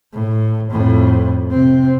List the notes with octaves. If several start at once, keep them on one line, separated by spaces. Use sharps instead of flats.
A2
F2 A2
C3 C4